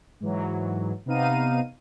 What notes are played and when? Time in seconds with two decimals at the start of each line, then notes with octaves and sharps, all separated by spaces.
0.20 G#2 E3 F#3
1.06 C3 B3 D#4 F5 D#7